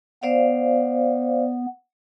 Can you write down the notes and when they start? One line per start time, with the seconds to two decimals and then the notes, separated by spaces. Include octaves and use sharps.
0.23 B3 C5 D5 F5